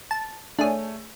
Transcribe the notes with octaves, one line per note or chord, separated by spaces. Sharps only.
A5
A3 D4 G#4 C#5